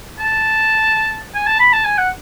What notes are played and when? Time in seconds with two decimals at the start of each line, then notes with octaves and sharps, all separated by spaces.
0.19 A5
1.34 G#5
1.47 A5
1.59 B5
1.73 A5
1.85 G#5
1.98 F#5